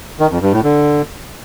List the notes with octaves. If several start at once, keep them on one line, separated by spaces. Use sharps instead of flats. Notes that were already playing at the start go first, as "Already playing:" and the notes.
D#3
F2
G2
A2
D3